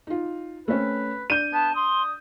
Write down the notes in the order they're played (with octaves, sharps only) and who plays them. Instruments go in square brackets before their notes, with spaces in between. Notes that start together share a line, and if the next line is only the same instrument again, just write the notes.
[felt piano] D#4 F4
[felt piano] A3 C4 C#4 [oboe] B4
[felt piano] D4 [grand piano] G6 D#7
[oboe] B3 [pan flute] A5
[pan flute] C6 [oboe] D#6